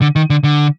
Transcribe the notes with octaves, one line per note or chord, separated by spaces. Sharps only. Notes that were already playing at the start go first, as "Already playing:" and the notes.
D3
D#3
D3
D3